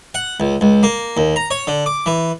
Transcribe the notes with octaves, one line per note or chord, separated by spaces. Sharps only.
F#5
C#2
C#2
A#3
D#2
A#5
C#5
D3
D6
E3